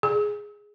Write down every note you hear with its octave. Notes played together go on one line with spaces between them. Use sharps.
G#4